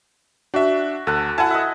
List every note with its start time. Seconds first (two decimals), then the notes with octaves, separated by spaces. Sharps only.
0.54 D4 F#4 E5
1.07 D2 A4 F#5
1.38 E4 F#5 G#5 A5
1.51 D#5 E5